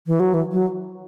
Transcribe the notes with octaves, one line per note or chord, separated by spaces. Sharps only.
E3
F#3
E3
F#3